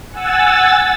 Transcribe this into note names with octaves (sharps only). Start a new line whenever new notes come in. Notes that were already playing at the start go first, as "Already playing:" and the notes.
F#5 G#5 E6 A6